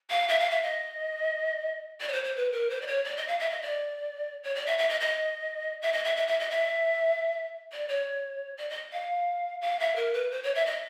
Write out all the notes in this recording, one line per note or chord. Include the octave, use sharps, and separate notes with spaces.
F5
E5
F5
E5
D#5
D5
C#5
C5
C5
B4
A#4
C5
D5
C#5
D5
D#5
F5
E5
D#5
D5
C#5
D5
E5
E5
D#5
D#5
E5
D#5
E5
E5
E5
D#5
E5
D5
C#5
D5
D#5
F5
F5
E5
A#4
B4
C5
C#5
E5
D#5